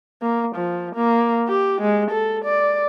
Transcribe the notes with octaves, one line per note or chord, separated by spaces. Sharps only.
A#3
F3
A#3
G4
G#3
A4
D5